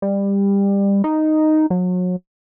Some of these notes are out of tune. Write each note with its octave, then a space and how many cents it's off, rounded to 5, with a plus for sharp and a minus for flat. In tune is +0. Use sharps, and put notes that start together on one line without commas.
G3 +20
D#4 -5
F#3 -35